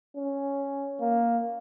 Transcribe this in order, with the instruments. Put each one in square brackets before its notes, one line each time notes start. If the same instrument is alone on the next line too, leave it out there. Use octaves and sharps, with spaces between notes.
[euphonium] C#4
A#3